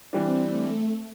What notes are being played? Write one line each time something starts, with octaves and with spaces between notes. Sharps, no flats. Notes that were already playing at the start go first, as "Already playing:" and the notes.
E3 G3 C4 D4
A3